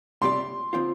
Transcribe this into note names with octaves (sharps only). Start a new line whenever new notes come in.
C3 G3 C4 G4 D5 C6
D3 F3 C4 F4 C5